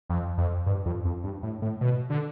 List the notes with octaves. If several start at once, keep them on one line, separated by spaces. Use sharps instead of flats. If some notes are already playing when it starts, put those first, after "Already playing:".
F2
F2
G2
F2
F2
G2
A2
A2
B2
D3